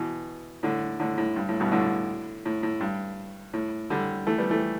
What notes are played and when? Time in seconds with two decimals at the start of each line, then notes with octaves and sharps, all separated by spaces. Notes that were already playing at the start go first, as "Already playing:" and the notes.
Already playing: B2 E3
0.63 A2 D3
1.00 A2 D3
1.18 A2
1.36 G2
1.49 A2
1.60 G2 B2
1.72 A2 D3
2.45 A2
2.63 A2
2.81 G2
3.53 A2
3.90 D3 G3
4.27 E3 A3
4.38 G3 B3
4.50 E3 A3